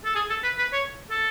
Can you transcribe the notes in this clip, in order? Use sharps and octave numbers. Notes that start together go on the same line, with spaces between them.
A4
G#4
A4
B4
B4
C#5
A4